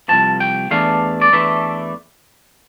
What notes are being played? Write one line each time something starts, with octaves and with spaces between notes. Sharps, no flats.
C2 C3 F3 A5
G5
E2 E3 A3 D4 F5
D5
E2 E3 A3 D4 E5